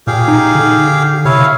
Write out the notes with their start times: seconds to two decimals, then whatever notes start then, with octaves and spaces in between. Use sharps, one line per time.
0.07 A#2 G4 G#4 F5
0.28 D#4
0.55 D3
1.25 C3 E4 C#5 F5